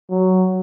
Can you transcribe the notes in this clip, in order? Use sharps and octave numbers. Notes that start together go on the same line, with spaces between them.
F#3